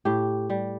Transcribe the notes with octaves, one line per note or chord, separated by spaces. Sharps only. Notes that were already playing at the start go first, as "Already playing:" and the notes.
A2 G4
G3